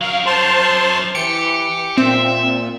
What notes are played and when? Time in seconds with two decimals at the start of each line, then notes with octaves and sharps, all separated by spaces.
0.01 F#3 A#4 F5
0.26 C5 A5 C6
1.15 E3 G4 C#7
1.98 A#2 C4 E5